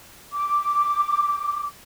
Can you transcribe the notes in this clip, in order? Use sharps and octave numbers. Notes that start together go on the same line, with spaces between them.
D6